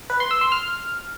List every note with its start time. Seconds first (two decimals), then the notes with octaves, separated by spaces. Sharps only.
0.10 B4
0.20 C6
0.31 E6
0.41 C6
0.52 F6